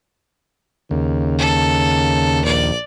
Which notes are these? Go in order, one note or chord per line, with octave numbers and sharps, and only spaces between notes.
D#2 C#3
A4
A#1 D5